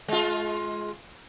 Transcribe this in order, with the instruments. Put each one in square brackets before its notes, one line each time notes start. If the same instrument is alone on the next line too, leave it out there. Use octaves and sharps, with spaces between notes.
[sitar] G#3 F4